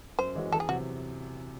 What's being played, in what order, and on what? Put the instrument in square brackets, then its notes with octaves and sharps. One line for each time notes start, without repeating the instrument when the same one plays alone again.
[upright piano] F#2 [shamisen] C5
[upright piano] E3 G#3 C#4 F#4
[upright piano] E2 [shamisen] A4
[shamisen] G#4
[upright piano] C3 F#3 [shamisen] F#4